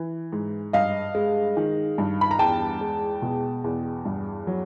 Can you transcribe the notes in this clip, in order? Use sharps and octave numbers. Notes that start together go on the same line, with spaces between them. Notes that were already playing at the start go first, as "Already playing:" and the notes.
Already playing: E3
G#2
G2 D#5 F5
G#3
D#3
G2
B5
A#5
E2 G5 A5
G#3
B2
E2
G2
F#3